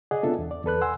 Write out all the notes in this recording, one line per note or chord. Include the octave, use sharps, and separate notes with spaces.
G#4 D5 D#5 F#5
B3 C4 D4 F4 A4 E5
E2
D5
E2 A4 B4 F#6
F#5 G#5 C6 E6